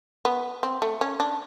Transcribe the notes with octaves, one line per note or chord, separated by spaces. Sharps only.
B3
C4
A3
C#4
D4